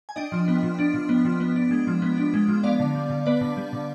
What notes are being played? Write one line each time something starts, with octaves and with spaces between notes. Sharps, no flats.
G#5
D4 D#5 G5
F3
B3
F3
D4
F3
B3
F3
B3
D4
G#3
F3
B3
D4
G#3
F3
B3 D5 F5
D3
G3
D3
B3 B4 D5
D3
G3
D3